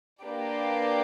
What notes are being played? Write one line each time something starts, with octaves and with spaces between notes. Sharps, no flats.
A#3 D4 G4 B4 D5